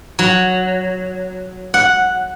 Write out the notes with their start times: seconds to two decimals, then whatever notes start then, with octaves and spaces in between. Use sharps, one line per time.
0.19 F#3
1.74 F#5